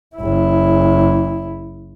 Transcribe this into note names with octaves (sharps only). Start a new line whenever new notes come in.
F#1 E4